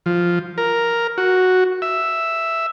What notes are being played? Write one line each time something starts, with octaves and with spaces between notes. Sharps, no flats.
F3
A#4
F#4
E5